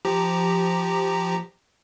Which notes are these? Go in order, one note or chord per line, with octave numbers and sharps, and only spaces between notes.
F3 G4 A#5